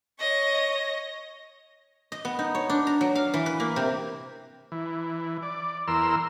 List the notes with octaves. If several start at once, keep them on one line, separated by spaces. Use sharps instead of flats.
C#5 D#5
D#5
B3
D#4
C#5
D4
A#5
F#3
F5
E3
B4
A#3
C3
E3
D5
E2 A#4 C6 E6